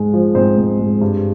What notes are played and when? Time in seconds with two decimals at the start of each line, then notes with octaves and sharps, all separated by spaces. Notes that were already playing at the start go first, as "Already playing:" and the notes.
Already playing: G#2 G#3
0.14 F3
0.35 G#2 C4 C5
0.58 G#2
0.79 G#3
1.01 G2